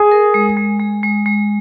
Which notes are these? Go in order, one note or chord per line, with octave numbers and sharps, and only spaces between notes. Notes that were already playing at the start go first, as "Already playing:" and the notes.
Already playing: G#4
A#4
G#3
G#3
G#3
G#3
G#3